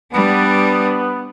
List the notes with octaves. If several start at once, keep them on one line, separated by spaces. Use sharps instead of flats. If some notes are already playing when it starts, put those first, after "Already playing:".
G3 B3 D4